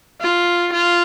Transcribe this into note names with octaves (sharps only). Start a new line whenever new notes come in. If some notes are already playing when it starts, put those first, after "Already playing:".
F4
F4